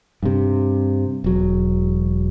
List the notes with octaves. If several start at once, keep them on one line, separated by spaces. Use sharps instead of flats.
G2 C3
E1 F#3